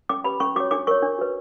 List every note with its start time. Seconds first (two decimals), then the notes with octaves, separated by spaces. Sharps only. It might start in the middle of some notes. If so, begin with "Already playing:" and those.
0.09 C#4 D6
0.24 G4 B4 B5
0.40 C#4 C#6
0.56 F#4 C#5 D6
0.71 D4 D6
0.87 A#4 C#5 C#6
1.02 D4
1.19 F#4 B4